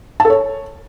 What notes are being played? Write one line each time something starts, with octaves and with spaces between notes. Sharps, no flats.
A5
A4
C#5